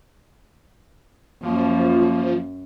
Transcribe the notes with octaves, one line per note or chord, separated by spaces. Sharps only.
F#2 F3 A#3